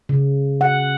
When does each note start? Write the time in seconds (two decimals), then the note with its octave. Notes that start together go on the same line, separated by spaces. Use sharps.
0.09 C#3
0.61 F#5